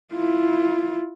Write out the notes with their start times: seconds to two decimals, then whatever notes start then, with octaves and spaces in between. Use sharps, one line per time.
0.14 E4 F4